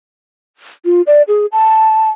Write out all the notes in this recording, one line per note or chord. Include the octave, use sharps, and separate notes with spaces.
F4
D5
G#4
A5